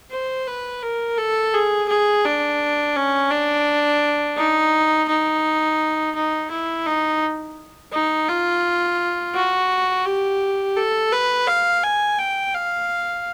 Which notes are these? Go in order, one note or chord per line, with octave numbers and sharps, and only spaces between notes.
C5
B4
A#4
A4
G#4
G#4
D4
C#4
D4
D#4
D#4
D#4
E4
D#4
D#4
F4
F#4
G4
A4
B4
F5
G#5
G5
F5